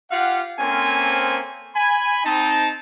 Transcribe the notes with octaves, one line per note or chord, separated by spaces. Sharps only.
F4 G4 F5 F#5
A#3 C4 C#4 A4 C5 G#5
G#5 B5
C4 D#4 A5